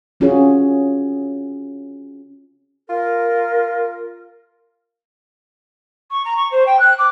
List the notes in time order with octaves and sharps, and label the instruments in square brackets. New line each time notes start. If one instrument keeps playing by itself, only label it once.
[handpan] C4 C#4 F4 F#4 G#4 C#5
[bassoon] F4 [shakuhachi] A#4
[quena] C#6
A#5
C#6
C5
G5
F#6
D6